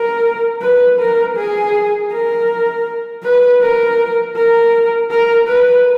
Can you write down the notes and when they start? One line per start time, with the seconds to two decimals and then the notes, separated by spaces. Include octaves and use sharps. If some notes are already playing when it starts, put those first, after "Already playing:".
Already playing: A#4
0.62 B4
1.00 A#4
1.37 G#4
2.12 A#4
3.24 B4
3.62 A#4
4.36 A#4
5.11 A#4
5.49 B4